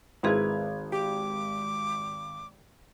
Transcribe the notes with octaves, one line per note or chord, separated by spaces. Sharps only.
G#1 E4 G#4 A#4 B4 C6 D#6 G#6
G4 D6